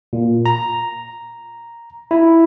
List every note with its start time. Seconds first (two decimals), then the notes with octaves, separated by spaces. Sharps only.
0.13 A#2
0.46 A#5
2.11 E4